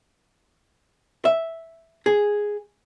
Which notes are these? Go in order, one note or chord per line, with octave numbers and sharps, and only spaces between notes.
E5
G#4